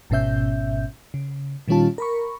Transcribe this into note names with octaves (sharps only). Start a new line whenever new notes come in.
G#1 G#2 B2 C#4 E5 G6
C#3
A#2 D#3 G3 C#4 F4 A5
A#4 B5 C#6